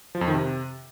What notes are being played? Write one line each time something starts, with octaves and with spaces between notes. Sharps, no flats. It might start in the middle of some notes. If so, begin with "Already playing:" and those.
F3
F2
D#3
C3